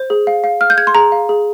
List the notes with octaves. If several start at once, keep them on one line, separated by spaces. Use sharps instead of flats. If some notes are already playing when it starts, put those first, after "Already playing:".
Already playing: C5
G#4
F5
F5
F5 F6
G6
G#4 G#6
C6
G#4 A#5
F5
G#4